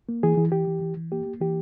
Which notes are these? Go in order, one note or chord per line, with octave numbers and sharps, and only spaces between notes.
A#3
E3 G#4
E3
E3 G4
E3
E3
E3
A#3 G4
A#3
E3 G4